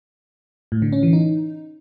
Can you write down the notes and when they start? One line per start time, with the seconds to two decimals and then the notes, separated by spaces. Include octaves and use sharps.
0.72 A2
0.82 D3
0.92 C#4
1.03 E3
1.13 D#4